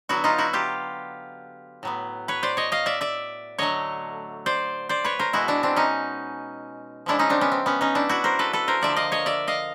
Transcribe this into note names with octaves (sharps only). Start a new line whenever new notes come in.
D3 F#3 B3 E4 F#4
D#4 F4
E4 F#4
F4 G4
A2 F#3 B3
B4 C#5
C5 D5
C#5 D#5
D#5 F5
D5 E5
D5 E5
D3 F#3 A3 C#5 D#5
C5 D5
C5 D5
B4 C#5
A#4 C5
B2 G#3 B3 E4 F#4
D4 E4
C4 D4
C#4 D#4
C#3 F3 G#3 D4 E4
C#4 D#4
C4 D4
B3 C#4
C4
B3 C#4
C#4 D#4
D4 E4
E4 F#4
A#4 C5
A4 B4
A4 B4
A#4 C5
D3 F3 A#3 D5 E5
D#5 F5
C#5 D#5
D5 E5
D#5 F5